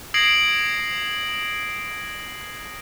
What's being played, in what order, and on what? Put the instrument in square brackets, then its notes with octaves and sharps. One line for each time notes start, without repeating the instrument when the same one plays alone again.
[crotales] D#6 G#6 A#6 C7 D7 F#7